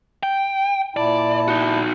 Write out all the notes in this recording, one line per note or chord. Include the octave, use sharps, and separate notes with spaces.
G5
A#2 E4 D5 A5
D#4 F#4